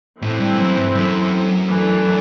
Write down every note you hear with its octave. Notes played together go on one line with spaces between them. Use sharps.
A2 E3 A3 C4 E4
G2
F#2
G2
F#2
E3 A3 D4